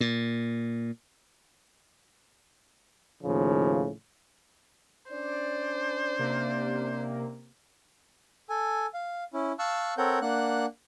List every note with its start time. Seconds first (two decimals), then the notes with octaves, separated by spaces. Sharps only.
0.01 A#2
3.24 D#2 A2 C#3 F3
5.11 C#4 D4 C5 D5
6.19 C3 A#3
8.49 A4 G#5
8.94 F5
9.34 C#4 E4
9.59 F5 A5 C#6 E6 F#6
9.98 C4 A4 A#4 C#5 F#5 G6
10.22 A#3 D4 F#5 F#6